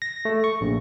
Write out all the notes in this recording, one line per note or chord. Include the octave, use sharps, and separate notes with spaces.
A#6
A3
C#6
A#1